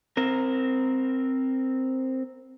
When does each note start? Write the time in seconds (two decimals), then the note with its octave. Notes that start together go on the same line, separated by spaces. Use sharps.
0.17 C4 A#4